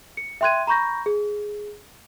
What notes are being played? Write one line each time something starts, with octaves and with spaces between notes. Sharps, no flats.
C#7
E5 G5 C6 F#6 G#6 D#7
A#5 B5 C#6 G6 A#6
G#4